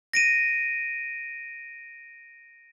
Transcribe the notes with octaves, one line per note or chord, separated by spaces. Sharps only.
A#6 D7 D#7